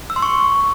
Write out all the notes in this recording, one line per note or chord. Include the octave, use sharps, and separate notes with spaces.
E6
C6
C#6